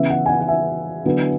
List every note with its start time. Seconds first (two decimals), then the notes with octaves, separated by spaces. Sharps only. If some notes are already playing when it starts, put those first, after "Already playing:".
Already playing: C#3 E3 B3 E5
0.10 F#5
0.26 G#5
0.29 F#5
0.40 F#5
0.48 E5 G#5
1.05 D3 F#3 B3 E4